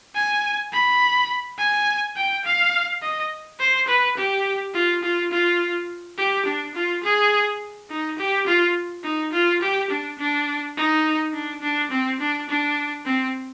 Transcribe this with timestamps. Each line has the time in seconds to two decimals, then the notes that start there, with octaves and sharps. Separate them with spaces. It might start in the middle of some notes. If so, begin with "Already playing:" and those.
0.15 G#5
0.72 B5
1.58 G#5
2.16 G5
2.45 F5
3.02 D#5
3.59 C5
3.87 B4
4.17 G4
4.73 F4
5.02 F4
5.31 F4
6.18 G4
6.45 D4
6.75 F4
7.03 G#4
7.90 D#4
8.18 G4
8.46 F4
9.03 D#4
9.32 F4
9.61 G4
9.90 D4
10.18 D4
10.77 D#4
11.33 D4
11.61 D4
11.90 C4
12.20 D4
12.49 D4
13.05 C4